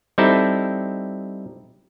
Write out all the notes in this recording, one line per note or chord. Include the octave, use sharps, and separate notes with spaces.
G3 C4 D#4 E4 A4